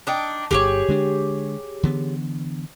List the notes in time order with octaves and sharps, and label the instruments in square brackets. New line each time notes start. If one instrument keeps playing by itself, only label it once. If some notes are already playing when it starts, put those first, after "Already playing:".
[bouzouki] D4 D#4 G5
[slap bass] G1 G2 D3 [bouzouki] G4 G#4 C#5
[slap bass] D3 G#3 D4
D3 E3 B3